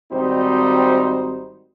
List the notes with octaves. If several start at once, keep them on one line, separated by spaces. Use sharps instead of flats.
G#1 G3 C4 D#4 F#4 C5